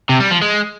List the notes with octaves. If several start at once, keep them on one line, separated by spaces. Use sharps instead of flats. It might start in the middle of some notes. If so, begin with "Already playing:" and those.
C3
G3
F3
G#3